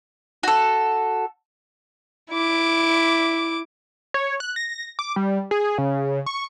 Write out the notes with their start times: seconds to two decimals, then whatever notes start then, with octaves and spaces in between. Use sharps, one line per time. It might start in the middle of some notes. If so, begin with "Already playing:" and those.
0.43 F#4 A4
2.32 E4 D6
4.14 C#5
4.40 F#6
4.56 A#6
4.99 D6
5.16 G3
5.51 G#4
5.78 C#3
6.26 C#6